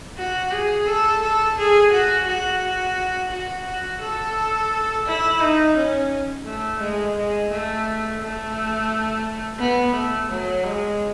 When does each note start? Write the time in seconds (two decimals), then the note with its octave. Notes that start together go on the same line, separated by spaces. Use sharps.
0.18 F#4
0.52 G#4
0.87 A4
1.22 A4
1.58 G#4
1.92 F#4
2.27 F#4
3.31 F#4
3.66 F#4
4.01 A4
5.06 E4
5.40 D#4
5.76 C#4
6.46 A3
6.80 G#3
7.15 G#3
7.50 A3
8.20 A3
9.60 B3
9.95 A3
10.30 F#3
10.64 G#3